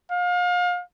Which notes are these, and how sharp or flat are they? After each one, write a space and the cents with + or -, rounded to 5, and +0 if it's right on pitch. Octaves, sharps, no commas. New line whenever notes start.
F5 +35